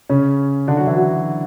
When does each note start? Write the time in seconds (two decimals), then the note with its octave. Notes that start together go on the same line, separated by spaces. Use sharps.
0.09 C#3 C#4
0.68 D3 D4
0.77 F#3 F#4
0.87 E3 E4
0.96 F#3 F#4